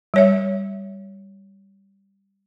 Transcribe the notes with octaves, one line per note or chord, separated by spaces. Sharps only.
G3 C#5 E5